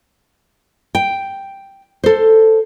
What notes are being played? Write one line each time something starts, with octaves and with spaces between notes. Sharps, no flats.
G5
A4 C5